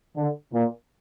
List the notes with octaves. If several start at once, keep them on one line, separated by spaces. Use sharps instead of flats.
D3
A#2